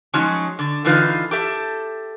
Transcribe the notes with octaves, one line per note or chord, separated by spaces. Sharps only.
F3 F#3 G#3 C#4 D#4
D3
D3 E3 D#4 F4 B4 F5
G4 A4 E5